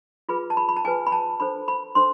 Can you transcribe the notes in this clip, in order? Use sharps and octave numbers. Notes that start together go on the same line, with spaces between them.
F4 G#4 B4 B5
A5
B5
B5
A5
F4 G#4 B4 G#5
B5
A5
D4 A4 C5 B5
B5
D4 A4 C5 C6